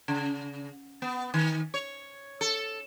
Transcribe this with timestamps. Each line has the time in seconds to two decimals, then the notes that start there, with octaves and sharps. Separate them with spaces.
0.08 C#3
1.02 B3
1.34 D#3
1.74 C#5
2.41 A4